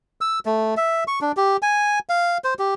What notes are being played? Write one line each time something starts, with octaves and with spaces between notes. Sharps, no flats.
E6
A3
E5
C#6
D4
G4
G#5
F5
C5
G4